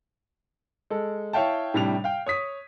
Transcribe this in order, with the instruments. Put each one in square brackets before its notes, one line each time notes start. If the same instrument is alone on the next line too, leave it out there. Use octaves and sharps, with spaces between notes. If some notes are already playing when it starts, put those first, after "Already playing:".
[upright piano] G#3 A4
E4 C#5 E5 F5 G5 A5
A2 C3 G3 D4 F7
F5 G5
C#5 D#6 B6